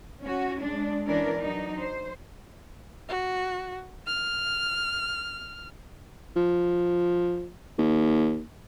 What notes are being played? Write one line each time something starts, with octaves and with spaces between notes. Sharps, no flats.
C#4 F#4
G#3 D4
E3 C#4 D4 A#4 D5
F#3 D4 D#4
C5
F#4
F6
F3
D#2